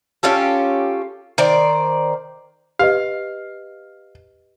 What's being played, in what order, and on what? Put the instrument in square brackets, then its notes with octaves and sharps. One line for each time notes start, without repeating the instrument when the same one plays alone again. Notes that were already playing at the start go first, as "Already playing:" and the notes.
[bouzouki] C#4 F4 G4 A4
D#3 C5 D5
[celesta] G4 B4 D#5 [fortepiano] F5